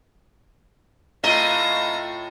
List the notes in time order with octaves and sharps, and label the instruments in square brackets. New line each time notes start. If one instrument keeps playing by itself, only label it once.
[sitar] A2 A3 D#5 [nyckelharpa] F4 A#5